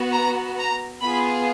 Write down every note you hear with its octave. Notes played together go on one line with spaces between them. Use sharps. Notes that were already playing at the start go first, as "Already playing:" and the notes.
Already playing: B3 F#4
A#5
A#5
B3 F4 G#4 B5